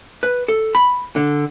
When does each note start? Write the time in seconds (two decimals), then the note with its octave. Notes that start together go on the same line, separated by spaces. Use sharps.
0.23 B4
0.48 A4
0.75 B5
1.16 D3